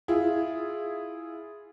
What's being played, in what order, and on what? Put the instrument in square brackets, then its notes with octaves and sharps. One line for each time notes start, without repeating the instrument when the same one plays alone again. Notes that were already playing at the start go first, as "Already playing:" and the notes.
[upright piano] E4 F4 G#4